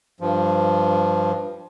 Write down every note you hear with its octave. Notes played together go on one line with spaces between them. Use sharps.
G2 F3